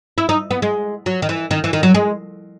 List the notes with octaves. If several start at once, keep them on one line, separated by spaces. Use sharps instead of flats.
E4
D#4
B3
G#3
F#3
D#3
E3
D#3
E3
D#3
F#3
G#3